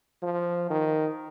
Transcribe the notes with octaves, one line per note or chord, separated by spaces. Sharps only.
F3
D#3